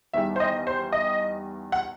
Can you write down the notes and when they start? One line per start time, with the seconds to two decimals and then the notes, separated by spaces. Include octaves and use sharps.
0.13 E2 D#3 G3 E5
0.36 C5
0.40 D#5
0.67 C5
0.92 D#5
1.72 F#5